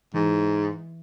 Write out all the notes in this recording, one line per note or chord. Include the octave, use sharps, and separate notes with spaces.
G#2 E3